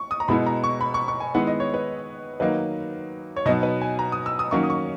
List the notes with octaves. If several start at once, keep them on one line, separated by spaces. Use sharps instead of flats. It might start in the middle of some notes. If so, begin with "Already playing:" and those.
Already playing: C#6
D#6
A#5
B2 G#3 B3 E4 B5
A#5
C#6
B5
C#6
C#6
G#5
D#3 G#3 B3 E4 F#5
D#5
C#5
B4
D#3 F#3 A#3 D#4 B4
C#5
B2 F#3 B3 D#4 D#5
B4
G#5
A#5
D#6
E6
D#6
D#3 F#3 A#3 C#4 C#6
D#6
C#6